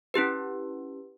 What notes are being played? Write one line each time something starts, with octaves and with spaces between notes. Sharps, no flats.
C#4 E4 G4 B4